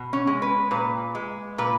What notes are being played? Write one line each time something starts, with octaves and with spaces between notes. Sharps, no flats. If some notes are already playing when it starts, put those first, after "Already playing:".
Already playing: B2
C#4
G#3
B4
A#2 B4
G#3
A#2 B4